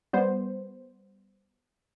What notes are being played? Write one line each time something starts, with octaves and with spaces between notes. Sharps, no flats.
G3 B3 C5